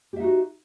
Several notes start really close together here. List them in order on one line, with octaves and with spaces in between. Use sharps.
G4 E5 D#4 F#4